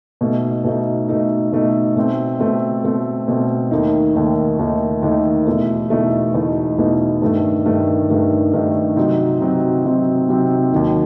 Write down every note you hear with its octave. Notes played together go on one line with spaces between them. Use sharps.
B2 A3 D#4
B2 A3 D#4
B2 A3 D#4
B2 A3 D#4
B2 A3 C4
B2 A3 C4
B2 A3 C4
B2 A3 C4
D#2 D#3 A3 D#4
D#2 D#3 A3 D#4
D#2 D#3 A3 D#4
D#2 D#3 A3 D#4
E2 B2 A3 D#4
E2 B2 A3 D#4
E2 B2 A3 D#4
E2 B2 A3 D#4
G2 D#3 A3
G2 D#3 A3
G2 D#3 A3
G2 D#3 A3
C3 F#3 C4 D#4
C3 F#3 C4 D#4
C3 F#3 C4 D#4
C3 F#3 C4 D#4
D#2 D#3 F#3